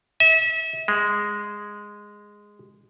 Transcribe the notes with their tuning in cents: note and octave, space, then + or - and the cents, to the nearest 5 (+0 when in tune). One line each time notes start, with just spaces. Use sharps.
E5 -35
G#3 -5